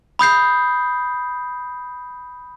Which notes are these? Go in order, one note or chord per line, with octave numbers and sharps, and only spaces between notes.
B5 D#6 G6 C7